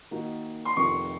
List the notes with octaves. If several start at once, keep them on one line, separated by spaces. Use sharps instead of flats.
D#3 A#3 D#4 F#4
C6
F1 F2 D#3 A3 C#6